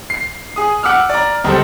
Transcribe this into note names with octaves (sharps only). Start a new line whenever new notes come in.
C7
G#4 D#6
F#5 D6 E6 F6
D5 A#5
C#2 G3 A4 C5